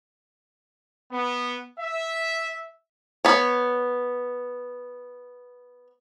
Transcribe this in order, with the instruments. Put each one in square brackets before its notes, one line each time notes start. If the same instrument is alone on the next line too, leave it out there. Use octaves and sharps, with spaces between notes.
[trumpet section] B3
E5
[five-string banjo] B3 C#5